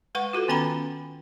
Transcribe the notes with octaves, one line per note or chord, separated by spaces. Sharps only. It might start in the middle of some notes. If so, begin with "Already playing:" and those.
G#3 B4 F#5 C#6
F4 F#4 A4 B4
D#3 B3 C#4 G5 A#5 B5